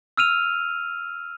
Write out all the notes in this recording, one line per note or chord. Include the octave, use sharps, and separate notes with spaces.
E6 F6 D#7 F7